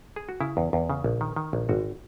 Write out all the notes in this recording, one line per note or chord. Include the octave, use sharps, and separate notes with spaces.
G#4
F#4
C#3 E4
E2
E2
C#3
A#1
D#3
D#3
A#1
G#1 F#4